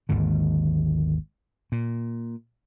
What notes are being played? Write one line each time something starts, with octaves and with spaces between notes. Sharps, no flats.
G#1 D#2 G#2 D3
A#2